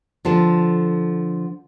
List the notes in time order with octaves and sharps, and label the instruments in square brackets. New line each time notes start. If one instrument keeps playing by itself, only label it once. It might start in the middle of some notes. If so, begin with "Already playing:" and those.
[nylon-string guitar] D3 F3 A4